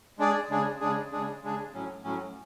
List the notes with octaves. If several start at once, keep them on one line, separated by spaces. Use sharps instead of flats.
G#3 D4 G#4 D5
C#3 G#3 D4 G#4
C#3 G#3 D4 G#4
C#3 G#3 D4 G#4
C#3 G#3 D4 G#4
A2 F#3 C#4
A2 F#3 C#4